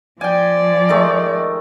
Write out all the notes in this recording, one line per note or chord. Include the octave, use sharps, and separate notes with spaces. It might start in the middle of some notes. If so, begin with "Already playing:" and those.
F3 D5 G5 G#5
D#3 G#3 A3